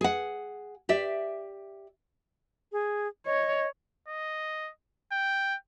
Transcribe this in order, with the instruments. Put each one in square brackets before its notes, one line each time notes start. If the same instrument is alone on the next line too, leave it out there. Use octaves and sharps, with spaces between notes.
[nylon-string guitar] G#4 F#5
G4 D5 E5
[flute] G#4
[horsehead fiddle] C#5 [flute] D#5
[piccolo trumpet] D#5
G5